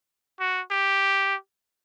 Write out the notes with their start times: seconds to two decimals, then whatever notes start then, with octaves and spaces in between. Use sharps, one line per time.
0.40 F#4
0.71 G4